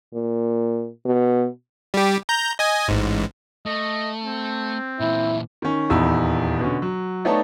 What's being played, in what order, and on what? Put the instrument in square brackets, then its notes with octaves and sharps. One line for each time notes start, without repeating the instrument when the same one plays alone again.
[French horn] A#2
B2
[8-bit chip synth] G3 G4
A#5 G6
D#5 G#5
A1 G#2
[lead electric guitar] A3 [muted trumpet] D#5
[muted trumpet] C4
[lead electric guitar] A#2 E3 [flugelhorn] E4
[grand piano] D#3 C#4
D#1 E2 D#4 B5 E6
B2 D3 C#4
F#3
A3 B3 D#4 C#5 D5 A5